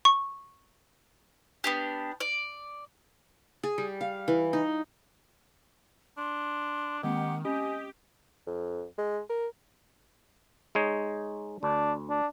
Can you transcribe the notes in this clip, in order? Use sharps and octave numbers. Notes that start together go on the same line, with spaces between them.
C#6
B3 D4 G4
D5
G#4
G3
F5
E3
D#4
D4 C6
D#3 G#3 A#3 C4 G4 F#5
C#4 G4 D#5 G#5
F2
G#3
A#4
G#3 D#4 C#5
D2 D4
D4